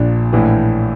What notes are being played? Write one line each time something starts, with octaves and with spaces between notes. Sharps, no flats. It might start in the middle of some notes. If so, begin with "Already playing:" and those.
Already playing: A#1 A#2 D4
A#1 A2 E3